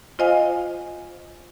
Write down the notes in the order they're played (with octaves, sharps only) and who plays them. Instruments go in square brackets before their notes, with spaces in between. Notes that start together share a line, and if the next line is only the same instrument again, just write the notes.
[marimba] F4 C5 D#5 F5 G#5